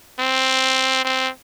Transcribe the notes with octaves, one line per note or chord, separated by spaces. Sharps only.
C4
C4